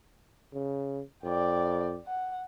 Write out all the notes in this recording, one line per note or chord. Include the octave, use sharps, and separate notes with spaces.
C#3
F2 D5 G5
F#5